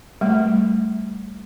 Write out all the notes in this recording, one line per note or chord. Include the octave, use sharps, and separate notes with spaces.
G3 A3